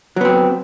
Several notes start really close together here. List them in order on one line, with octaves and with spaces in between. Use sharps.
F#3 B3 C4